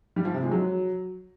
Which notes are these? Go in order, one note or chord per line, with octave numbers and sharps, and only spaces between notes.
G3
F3
C3
G#3
F#3